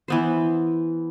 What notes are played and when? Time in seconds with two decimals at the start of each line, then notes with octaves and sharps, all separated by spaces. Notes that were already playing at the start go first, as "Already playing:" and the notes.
0.08 E3 B3 C5